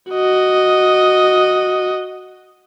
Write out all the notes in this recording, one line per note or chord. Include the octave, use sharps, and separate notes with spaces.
F#4 D#5